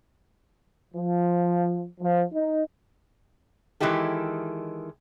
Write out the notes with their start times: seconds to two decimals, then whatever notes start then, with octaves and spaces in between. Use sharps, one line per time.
0.94 F3
2.01 F3
2.33 D#4
3.80 D#3 E3 G#3 E4 G4 A4